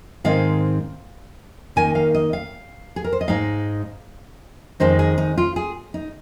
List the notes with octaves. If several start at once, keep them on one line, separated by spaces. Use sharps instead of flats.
G#2 D#3 G#3 C4 D#4 F5
D#3 A#3 D#4 G#5
F5
D#5
F5
G#4
A#4
C5
D#5
G#2 G#3 D#4 F5
F2 D#3 G#3 D#4 C5
G#4
D#4
F4
G#4
D#4